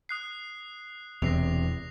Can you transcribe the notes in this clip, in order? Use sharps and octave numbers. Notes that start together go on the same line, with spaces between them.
D#6 F#6 C7
E1 E2 C3 A#6 C7 F7